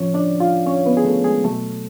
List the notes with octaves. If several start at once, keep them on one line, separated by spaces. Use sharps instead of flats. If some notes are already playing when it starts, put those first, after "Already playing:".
Already playing: A2 F3 C#4 C#5
D4 D5
F4 F5
C#4 C#5
B3 B4
G#4
A3 A4
G#3 G#4
B2 F#3 A3 A4